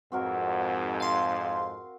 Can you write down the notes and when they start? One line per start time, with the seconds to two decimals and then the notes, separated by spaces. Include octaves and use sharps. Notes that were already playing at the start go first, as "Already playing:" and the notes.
0.12 F2 G#2 C4 F#4 A#4
1.00 F5 C6